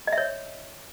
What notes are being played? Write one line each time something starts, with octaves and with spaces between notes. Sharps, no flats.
D#5
E5
C#5